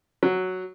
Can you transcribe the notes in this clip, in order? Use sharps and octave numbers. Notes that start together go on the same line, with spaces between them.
F#3